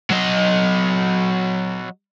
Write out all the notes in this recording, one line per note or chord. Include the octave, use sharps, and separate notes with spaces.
F#3 D#5